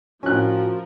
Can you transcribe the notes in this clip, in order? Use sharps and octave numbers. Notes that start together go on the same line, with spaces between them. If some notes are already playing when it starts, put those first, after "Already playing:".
A2 F3 C#4 F#4 A#4 G#5 F#6